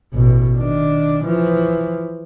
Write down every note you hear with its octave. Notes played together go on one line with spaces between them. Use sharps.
A1 B2
D#3 D4
E3 F3